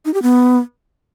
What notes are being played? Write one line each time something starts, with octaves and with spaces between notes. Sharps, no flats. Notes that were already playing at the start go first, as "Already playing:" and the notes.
D#4
G4
B3